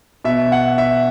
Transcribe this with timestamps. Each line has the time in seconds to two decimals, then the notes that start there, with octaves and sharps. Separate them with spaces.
0.24 B2 E5
0.52 F#5
0.78 E5